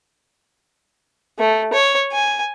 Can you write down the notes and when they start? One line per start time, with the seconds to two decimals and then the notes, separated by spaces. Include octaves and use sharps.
1.39 A3
1.73 C#5
2.12 G#5